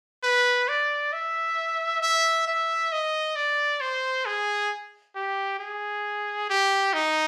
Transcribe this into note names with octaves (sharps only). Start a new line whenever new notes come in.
B4
D5
E5
E5
E5
D#5
D5
C5
G#4
G4
G#4
G4
D#4